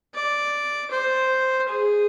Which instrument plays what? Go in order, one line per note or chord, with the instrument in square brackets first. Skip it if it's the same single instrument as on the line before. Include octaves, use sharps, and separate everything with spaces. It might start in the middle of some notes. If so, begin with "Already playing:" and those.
[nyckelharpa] D5
C5
G#4